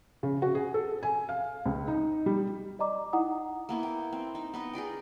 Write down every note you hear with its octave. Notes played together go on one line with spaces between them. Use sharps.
C#3
F#4
G#4
A4
G#5
F5
C#2
D#4
G3
D5 D#5 A#5 D6
D#4 E4 F#5 A#5 D#6
A#3 B3 E4
G5
C4
D#4
B3 B4 D#5
G#4 A#4 D5 G5